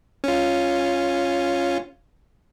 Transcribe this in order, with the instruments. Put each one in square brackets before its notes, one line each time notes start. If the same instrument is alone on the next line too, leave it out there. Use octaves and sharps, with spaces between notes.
[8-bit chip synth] C#4 F4